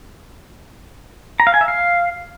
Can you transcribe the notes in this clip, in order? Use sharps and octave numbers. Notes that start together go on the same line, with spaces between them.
A#5
F5
G#5
E5
F5